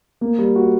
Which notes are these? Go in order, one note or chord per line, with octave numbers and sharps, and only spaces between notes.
A#3
G3
F#4